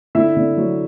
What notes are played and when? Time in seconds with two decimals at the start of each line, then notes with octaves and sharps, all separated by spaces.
0.15 D3 E4 E5
0.36 D3
0.57 F#3